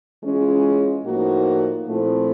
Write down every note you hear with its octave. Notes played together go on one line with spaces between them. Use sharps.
E3 G#3 C#4 F4
A2 F3 A#3 D#4 F#4
A#2 F3 A3 C4 E4